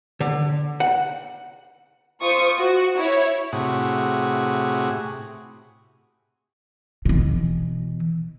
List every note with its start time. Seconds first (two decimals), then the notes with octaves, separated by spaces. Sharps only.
0.20 D3
0.80 F#5
2.22 F4 C5 C#6 D#6
2.60 F#4
2.97 E4 C#5
3.53 A2 C3 F#4 G#4
7.05 B2 E3